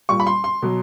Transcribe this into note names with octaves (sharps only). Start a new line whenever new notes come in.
A#2 G3 C#6
B5
C6
C6
B2 F#3